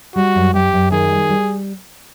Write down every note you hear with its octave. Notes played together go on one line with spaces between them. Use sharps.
G3 F#4
F#2
F#2 G4
F#2
D#3 G#4
G3
G3